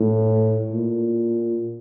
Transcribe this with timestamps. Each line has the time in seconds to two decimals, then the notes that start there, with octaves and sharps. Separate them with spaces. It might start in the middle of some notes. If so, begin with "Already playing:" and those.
Already playing: A2
0.72 A#2